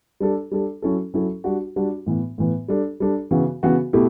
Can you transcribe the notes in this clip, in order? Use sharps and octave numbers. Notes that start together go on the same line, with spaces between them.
G3 D4 A4
G3 D4 A4
F#3 C#4 E4 A4
F#3 C#4 E4 A4
G3 D4 F#4
G3 D4 F#4
A2 E3 B3
A2 E3 B3
G3 D4 A4
G3 D4 A4
C#3 E3 B3 F#4
C#3 E3 B3 F#4
B2 A3 E4 G4